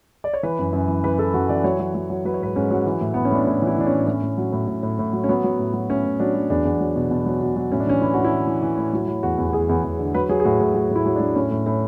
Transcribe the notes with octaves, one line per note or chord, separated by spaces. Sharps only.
D5
C#5
E3 B4
F#2
F#2
E3
E3 B4
E3 A4
F#2 F#4
E3 D5
F#3 C#5
F#3
F#3
F#3
F#3 B4
C#5
G#2 B4
G#2 C#4
F#3
E3
A2
A2 B3
C#4
A2 D4
A2 E4
E3
E4
E3 D4
C#4
A2
A2 C#4
A2
F#3
A2
A2
A2
A2
F#3
C#4
F#3 B3
F#3
A2
F#3
A2 C#4
A2
F#3 D4
F#3
E2 D4
E2
F#3
B2
B2
F#3
B2
F#3
A2 C#4
D4
E3 C#4
E3 E4
A2 F#4
E4
E3
E3
E3
A2
F#3 E4
F#3
E2 F#4
E2
F#4
E2 G#4
E2
E2
D3
F#3 B4
F#3 G#4
G#4
A2 F#4
A2 G#4
F#3 F#4
A2
E4
F#3
D4
F#3
A2 C#4
A2
A2 C#4